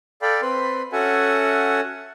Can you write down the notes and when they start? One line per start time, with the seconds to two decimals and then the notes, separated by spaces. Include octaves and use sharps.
0.22 A4 D5 F5 G5 B5
0.42 C4 B4 B5 C6
0.92 C#4 F#4 A4 E5 F#5 G#5